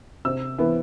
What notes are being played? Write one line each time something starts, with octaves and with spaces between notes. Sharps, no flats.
C3 E6
E3 B3